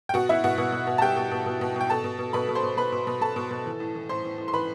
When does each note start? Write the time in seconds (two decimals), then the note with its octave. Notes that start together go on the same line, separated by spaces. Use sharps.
0.09 G5
0.14 B2 F#4 F#5
0.29 B2 E4 E5
0.44 B2 F#4 F#5
0.58 B2
0.72 B2
0.87 B2
0.98 A5
1.02 B2 G4 G5
1.16 B2
1.31 B2
1.46 B2
1.61 B2
1.76 B2 G5
1.90 B2 A4 A5
2.04 B2
2.19 B2
2.33 B2 B4 B5
2.49 B2
2.55 C5 C6
2.63 B2
2.77 B2 B4 B5
2.92 B2
3.07 B2
3.21 B2 A4 A5
3.36 B2
3.51 B2
3.66 E3
3.80 A2
3.95 E3
4.09 A2 C5 C6
4.24 E3
4.38 A2
4.48 C6
4.54 E3 B4 B5